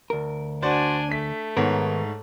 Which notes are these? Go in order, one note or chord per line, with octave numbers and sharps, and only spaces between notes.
D2 A#4
D4 F#4 C5 D5 G#5
A3 B6
G#2 D#3 B3 A#4 C#5